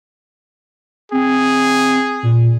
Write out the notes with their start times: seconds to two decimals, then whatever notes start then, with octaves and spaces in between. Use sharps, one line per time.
1.12 C4 G#4
2.23 A#2